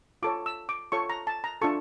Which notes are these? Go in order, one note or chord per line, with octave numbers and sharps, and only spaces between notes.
F4 A4 C#5 D6
E6
D6
F4 A4 C#5 C#6
A#5
A5
A#5
D4 F4 A4 C#6